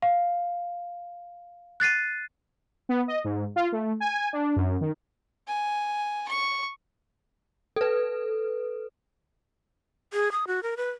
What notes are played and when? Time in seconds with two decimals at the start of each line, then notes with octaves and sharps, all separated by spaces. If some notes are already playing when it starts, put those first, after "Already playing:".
0.02 F5
1.80 F#6 A6 C7 D#7
2.89 B3
3.08 D#5
3.24 G#2
3.56 F4
3.72 A3
4.00 G#5
4.33 D4
4.56 F#2
4.81 D#3
5.48 G#5
6.28 C#6
7.76 A4 B4
10.13 G#4
10.32 D#6
10.47 F#4
10.63 A#4
10.77 B4